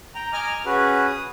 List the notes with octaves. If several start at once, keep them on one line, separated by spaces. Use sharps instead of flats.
G5 A#5
D#5 G#5 A#5 D6 F6
C#4 F#4 G#4 B4
D#6